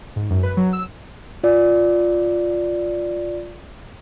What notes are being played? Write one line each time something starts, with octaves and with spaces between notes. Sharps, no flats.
G#2
F#2
B4
F#3
E6
F4 D5